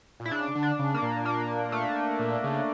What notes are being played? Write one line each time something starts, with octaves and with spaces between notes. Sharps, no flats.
A#2
E4
C#3 D4
D3
D4
C#3
A#3
A#2
A#3
A3
A#2
C#3